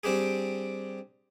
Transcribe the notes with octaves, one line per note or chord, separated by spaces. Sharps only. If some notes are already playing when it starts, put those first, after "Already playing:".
G3 C4 D4 G4 G#4